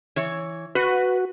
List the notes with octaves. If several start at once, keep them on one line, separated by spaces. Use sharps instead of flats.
E3 C#5
F#4 B4